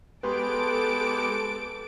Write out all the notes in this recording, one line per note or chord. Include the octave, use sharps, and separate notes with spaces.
G#3 B3 G4 A4 B4 C6 D6 D7